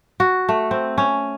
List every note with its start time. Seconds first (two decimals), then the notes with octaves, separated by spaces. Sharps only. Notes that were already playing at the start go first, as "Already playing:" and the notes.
0.20 F#4
0.49 A3
0.71 C4
0.98 C#4